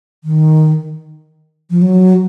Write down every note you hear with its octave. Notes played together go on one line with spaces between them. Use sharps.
D#3
F3
F#3